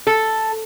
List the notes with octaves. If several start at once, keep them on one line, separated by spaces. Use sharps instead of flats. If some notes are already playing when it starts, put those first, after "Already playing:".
A4